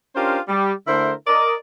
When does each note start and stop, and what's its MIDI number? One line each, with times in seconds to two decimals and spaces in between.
0.15 0.39 61
0.15 0.39 62
0.15 0.39 65
0.15 0.39 67
0.15 0.39 70
0.15 0.39 72
0.48 0.72 55
0.87 1.13 50
0.87 1.13 57
0.87 1.13 64
0.87 1.13 70
0.87 1.13 72
1.27 1.54 70
1.27 1.54 74
1.27 1.54 75